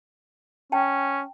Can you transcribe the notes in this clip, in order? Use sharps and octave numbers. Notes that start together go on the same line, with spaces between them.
C#4 G5 A5